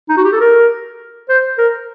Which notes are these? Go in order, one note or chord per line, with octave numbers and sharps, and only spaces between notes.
D#4
F#4
G4
A4
A#4
C5
A#4